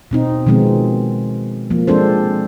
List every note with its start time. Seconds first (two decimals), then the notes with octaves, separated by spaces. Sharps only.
0.11 B2 C4 D#4
0.46 B2 D#3 F3 G#3 B3 C4
1.70 F3 A#3
1.87 F3 G#3 C4 D4 A4 C5